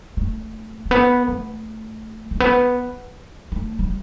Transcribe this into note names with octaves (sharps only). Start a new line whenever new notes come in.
A3
A3
B3
A3
A3
B3
A3
G3